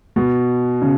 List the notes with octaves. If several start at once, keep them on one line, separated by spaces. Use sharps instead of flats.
B2
C#3